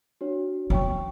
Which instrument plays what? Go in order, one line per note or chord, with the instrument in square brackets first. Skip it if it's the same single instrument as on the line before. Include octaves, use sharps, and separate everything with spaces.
[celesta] D4 F#4 C#5
[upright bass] B3 [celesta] C#5 G5 C#6